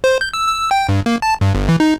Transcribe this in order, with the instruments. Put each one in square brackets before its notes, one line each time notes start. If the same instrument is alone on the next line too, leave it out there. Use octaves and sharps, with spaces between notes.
[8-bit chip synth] C5
G6
E6
E6
G5
G2
A#3
A5
G2
G1
E3
D#4